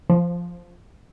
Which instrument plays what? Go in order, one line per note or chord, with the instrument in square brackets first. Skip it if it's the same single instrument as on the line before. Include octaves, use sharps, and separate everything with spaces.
[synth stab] F3